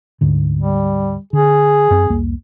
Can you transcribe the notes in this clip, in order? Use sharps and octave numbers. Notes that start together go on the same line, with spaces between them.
D2 G#2 D3
G3
D3 G#4
F#2 C4
C2 F2 A#3